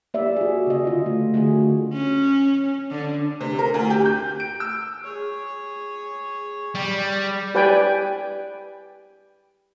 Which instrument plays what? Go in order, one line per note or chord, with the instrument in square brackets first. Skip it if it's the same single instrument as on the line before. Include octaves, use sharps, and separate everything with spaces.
[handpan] A#3 G4 D5 E5
F#4 G#4
C#3 D#5
D3 F4
A3
D3 A3 F#4 G#4
[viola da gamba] C#4
D3
[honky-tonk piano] C3
A#4
D2
G4
G6
D7
E6
[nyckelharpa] G#4 C#5
[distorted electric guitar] G3
[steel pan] G4 B4 D5 G5 G#5